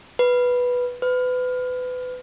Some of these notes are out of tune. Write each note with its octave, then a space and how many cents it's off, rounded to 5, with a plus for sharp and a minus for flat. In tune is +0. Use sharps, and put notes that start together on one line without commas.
B4 -5
B4 +30